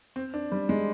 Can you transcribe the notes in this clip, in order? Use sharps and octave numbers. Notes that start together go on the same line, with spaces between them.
C4
D4
G3
G#3